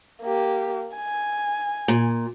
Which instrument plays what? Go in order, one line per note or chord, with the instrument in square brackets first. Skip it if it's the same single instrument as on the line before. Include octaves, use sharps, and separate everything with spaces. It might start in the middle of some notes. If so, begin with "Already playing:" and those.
[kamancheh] A#3 G4
G#5
[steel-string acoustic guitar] A#2